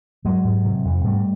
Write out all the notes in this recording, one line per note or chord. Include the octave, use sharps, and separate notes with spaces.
G#2 F#3 G#3
G#2
C3
F2
G#2 G3 A3